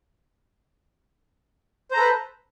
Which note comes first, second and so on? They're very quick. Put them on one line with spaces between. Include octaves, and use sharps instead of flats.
C5 A#5 A4 B4